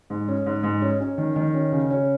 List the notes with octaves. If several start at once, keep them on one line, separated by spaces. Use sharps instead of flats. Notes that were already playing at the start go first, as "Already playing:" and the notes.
G#2
C#4
G#2
G#2
C#4
C#4
D#3
D#3
C#4
C#3
C#4